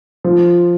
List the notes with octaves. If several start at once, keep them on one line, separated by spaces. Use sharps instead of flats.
F3